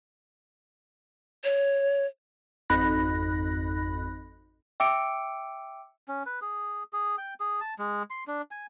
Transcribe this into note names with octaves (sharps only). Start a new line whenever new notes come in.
C#5
G#1 F2 D#4 B5 F#6 A#6
E5 G5 D6 E6 C#7 D7
C#4
B4
G#4
G#4
G5
G#4
A5
G#3
C6
D4
G#5